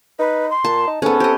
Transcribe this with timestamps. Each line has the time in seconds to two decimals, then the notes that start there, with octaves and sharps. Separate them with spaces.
0.19 D#4 B4
0.50 C6
0.65 A#2 A5
0.88 D#4
1.02 G#2 B3 C#4 A4
1.20 C4 G4 D#5